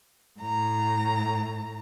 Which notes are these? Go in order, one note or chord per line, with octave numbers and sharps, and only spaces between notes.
A2 A#5